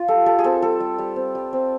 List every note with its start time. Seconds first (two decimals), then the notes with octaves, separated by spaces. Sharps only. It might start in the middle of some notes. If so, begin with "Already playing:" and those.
Already playing: F4
0.08 G3 A4
0.26 G3 A4
0.39 G#4
0.44 C4 A4
0.62 G3 A4
0.80 G3
0.99 G3
1.16 C4
1.35 G3
1.53 C4